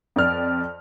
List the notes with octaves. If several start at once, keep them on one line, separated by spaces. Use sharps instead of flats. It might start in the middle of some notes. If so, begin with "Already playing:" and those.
F2 D5 F6